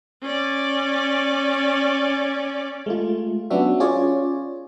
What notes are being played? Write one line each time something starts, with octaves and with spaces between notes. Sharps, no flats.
C#4 D5
G#3 A3 F4
F#3 B3 C#4 D4 F#4 E5
C#4 F4 G#4 C#5 D5